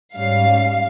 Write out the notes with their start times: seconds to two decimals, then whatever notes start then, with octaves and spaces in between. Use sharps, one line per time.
0.15 G#2 G3 C#4 F5